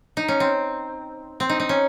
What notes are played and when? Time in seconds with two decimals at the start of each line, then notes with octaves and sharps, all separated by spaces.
0.17 D#4
0.28 C#4
0.40 C4
1.40 C4
1.49 D#4
1.60 D#4
1.69 C#4